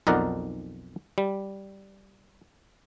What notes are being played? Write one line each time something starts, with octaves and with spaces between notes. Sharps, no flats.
B1 F2 D#4 A#4 D5 F#5
G3